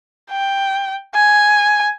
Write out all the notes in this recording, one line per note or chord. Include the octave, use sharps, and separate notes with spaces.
G5
G#5